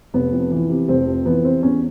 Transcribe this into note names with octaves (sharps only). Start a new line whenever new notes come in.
F1 B3
F2
E3
C3
F1 C4
F2
E3 B3
C3 C4
E2 C#4